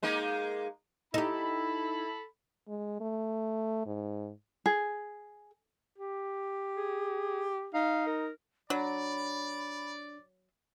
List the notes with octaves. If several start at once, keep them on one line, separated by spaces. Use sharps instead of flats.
G#3 A#3 D#4
D#4 E4 G4 A4 B5
G#3
A3
G#2
G#4
G4
G#4
D#4 F5
A#4
F#3 D4 D5 B5